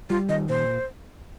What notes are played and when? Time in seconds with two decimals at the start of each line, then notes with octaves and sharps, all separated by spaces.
0.10 G3 F4
0.29 D#3 D#5
0.49 A#2 C5